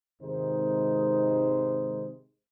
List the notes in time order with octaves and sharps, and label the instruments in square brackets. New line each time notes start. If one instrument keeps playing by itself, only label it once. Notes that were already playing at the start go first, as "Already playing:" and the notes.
[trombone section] G#1 C3 D#3 G#3 D#4 C5